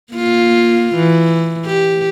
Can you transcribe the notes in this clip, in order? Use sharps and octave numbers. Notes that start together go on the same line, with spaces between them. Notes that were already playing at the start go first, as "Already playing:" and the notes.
A#3 F4
E3
G4